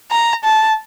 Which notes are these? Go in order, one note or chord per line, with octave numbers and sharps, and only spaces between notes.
A#5
A5